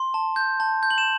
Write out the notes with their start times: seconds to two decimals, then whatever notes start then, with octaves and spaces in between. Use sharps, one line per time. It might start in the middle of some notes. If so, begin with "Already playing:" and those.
Already playing: C6
0.14 A5
0.36 G6
0.60 A5
0.83 G6
0.91 F#7
0.98 E7